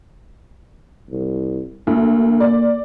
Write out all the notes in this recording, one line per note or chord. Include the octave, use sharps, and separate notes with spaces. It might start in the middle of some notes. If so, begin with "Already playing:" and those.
C2
D2 A#3
D5